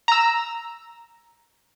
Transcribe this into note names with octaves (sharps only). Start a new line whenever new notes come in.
A#5 E6